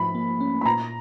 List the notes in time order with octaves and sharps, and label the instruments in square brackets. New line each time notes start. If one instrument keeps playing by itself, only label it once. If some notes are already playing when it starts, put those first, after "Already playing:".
Already playing: [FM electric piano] G#2 F3 A3 [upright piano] B5
[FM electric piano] A#3
C#4
[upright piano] B5
[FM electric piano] A#2 [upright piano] A#5